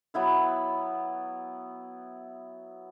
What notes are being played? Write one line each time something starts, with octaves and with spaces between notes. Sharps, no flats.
F#3 B3 E4 B4